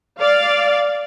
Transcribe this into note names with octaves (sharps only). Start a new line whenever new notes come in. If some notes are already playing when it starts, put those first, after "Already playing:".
D5 F5